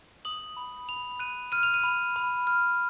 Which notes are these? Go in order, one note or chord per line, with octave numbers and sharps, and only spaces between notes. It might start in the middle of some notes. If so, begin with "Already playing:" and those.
D#6 F#7
B5
B5 F7
F#6 D#7
F6 D#7
F7
D#7
B5
B5
F6